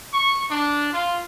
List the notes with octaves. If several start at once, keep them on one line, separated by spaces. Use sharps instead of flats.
C#6
D4
F4